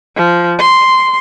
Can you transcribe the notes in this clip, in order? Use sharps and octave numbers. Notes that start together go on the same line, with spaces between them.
F3
C6